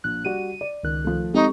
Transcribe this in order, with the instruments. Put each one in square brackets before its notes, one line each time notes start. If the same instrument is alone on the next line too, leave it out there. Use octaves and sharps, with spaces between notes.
[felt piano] A#1 [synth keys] F#6
[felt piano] G3 F#4 D5 [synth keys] D#7
[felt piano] D5
[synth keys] C#2 D#3 F#6
[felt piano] F3 A3
[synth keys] G#3 C4 G4 [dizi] D#4 [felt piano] A4 C#6